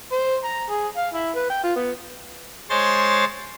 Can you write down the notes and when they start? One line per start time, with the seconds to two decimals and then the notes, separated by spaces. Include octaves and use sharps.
0.12 C5
0.44 A#5
0.70 G#4
0.97 F5
1.14 E4
1.35 B4
1.50 G5
1.64 F4
1.76 B3
2.70 G#3 C5 C#5 C6 A6